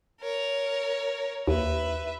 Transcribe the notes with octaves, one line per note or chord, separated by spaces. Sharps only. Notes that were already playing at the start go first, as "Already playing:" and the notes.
A#4 C#5
D#2 B4 E5